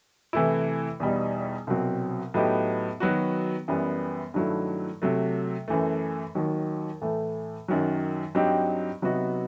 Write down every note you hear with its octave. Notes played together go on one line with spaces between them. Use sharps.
C3 E3 A3 E4
E2 B2 G3 D#4
C2 B2 F#3 C4
A2 F#3 B3 D#4 G4
D#3 F#3 B3 F#4
F#2 E3 G3 B3
G2 D#3 F#3 A3 E4
C3 F#3 A3
F#2 E3 A3
D#2 D#3 F#3
A2 E3 A3
F#2 D#3 F#3
G2 F#3 C4 D#4 G4
C3 F#3 B3 D#4 F#4